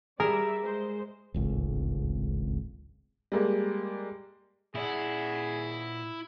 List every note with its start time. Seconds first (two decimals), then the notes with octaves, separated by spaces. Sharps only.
0.20 G3 G#4 A#4 D5 E5
0.64 G#3 C5
1.34 D1 G#1 C#2
3.32 G3 G#3 A#3
4.75 A#2 E4 G#4 D5 F#5